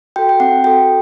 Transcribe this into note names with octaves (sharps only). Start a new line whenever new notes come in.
F#4 A4 G5
G5
C4 F#5
F#4 A4 G5